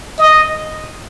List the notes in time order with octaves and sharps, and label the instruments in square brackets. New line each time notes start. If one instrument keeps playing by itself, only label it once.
[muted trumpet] D#5